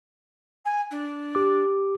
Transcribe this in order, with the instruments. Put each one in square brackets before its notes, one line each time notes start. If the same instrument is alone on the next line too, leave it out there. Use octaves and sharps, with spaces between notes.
[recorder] G#5
D4
[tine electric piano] G4 D6